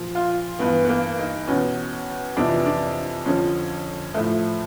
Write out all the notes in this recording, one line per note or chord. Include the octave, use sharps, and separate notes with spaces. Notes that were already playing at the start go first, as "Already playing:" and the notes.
Already playing: A#2 F3
F4
G2 E3 B3
B3
A#3
D#4
E2 B2 C#4
F2 C3 E3 D4
D4
F2 D3 F3 C#4
A2 F3 A3